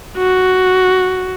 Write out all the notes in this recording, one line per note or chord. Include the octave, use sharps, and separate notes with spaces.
F#4